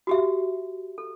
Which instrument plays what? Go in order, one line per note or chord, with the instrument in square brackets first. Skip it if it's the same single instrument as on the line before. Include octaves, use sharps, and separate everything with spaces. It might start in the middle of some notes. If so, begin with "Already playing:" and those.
[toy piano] F#4 G4 E5
A4